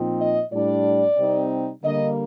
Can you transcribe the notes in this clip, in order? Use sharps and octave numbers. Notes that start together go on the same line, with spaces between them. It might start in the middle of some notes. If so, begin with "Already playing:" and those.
Already playing: A#2 F3 C4 D#4
D#5
A2 G3 D4 D5
C3 G3 C4 D#4
D3 G3 A#3 D#5